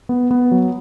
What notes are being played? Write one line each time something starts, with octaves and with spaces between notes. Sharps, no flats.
B3
B3
F#3